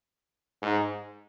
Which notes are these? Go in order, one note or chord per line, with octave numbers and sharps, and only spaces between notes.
G#2